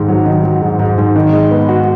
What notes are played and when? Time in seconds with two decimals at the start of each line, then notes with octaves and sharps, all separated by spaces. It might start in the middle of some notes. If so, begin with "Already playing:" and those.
Already playing: G#2 D#3
0.08 F#3
0.26 D#3
0.44 F#3
0.62 G#2
0.79 G#2
0.98 G#2
1.16 D#3
1.32 G#3
1.51 B3
1.69 F#4